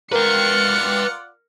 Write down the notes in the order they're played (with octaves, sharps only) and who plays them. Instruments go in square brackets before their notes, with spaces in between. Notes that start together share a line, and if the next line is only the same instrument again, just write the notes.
[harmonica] F4 D5 F#5 [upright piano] A#4 [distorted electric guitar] B4 G5 [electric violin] F6 C#7